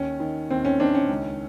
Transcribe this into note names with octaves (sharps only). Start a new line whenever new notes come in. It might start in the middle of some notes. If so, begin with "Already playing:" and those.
Already playing: D#2 C#4
D#3
D#2 C4
C#4
D#3 C4 D4
C#4
C#2